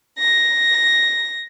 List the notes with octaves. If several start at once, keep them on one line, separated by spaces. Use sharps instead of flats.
A#6